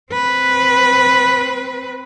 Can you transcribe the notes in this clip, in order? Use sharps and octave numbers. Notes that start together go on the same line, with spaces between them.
C4 B4